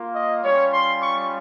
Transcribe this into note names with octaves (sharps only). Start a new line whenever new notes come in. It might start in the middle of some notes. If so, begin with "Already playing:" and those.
Already playing: A#3 F4
D#5
G3 C#4 F4 C#5
C6
C#6